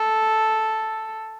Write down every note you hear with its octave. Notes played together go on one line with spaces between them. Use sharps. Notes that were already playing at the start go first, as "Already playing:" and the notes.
Already playing: A4